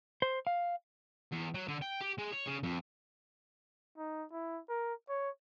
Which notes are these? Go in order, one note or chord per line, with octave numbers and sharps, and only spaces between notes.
C5
F5
E2
F#3
D3
G5
G4
G#3
C#5
C#3
F2
D#4
E4
A#4
C#5